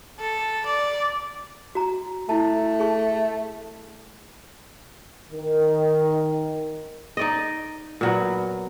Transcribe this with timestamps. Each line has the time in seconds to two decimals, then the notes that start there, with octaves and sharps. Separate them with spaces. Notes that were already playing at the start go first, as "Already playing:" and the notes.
0.19 A4
0.66 D5
1.75 F#4 A#5
2.29 A3 E4 A5
2.80 G#4 A5 C#6
5.30 D#3
7.17 D#4 D5 D#5
8.01 A#2 F#3 B3